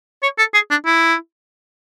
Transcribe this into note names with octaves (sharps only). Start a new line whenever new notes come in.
C#5
A4
G#4
D4
E4